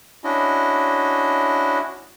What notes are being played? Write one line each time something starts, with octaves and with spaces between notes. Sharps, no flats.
C#4 D4 E4 F#4 D#5